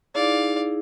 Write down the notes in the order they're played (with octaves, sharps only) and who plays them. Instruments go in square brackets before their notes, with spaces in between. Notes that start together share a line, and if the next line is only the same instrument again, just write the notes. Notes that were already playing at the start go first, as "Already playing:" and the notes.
[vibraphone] D#4 E4 G#4 [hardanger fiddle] D5 F5